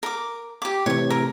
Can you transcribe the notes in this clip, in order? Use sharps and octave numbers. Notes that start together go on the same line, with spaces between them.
A#4 D6
G4 D6
A2 C3 E3 C#5 C#6
A#4